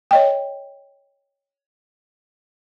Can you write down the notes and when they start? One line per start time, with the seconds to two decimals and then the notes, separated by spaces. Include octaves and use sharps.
0.11 C#5 D#5 G5